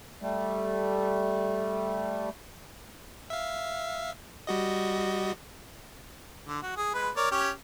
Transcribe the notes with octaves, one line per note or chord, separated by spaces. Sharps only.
G3 A3
E5 F5
G3 F#4 D#5
D3
F#4
G#4
G#3 B4
A#4 C#5 D5
C#4 G4 C#5